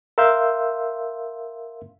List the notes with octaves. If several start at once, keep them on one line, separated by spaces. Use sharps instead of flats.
A#4 E5 F5 C6 E6 G6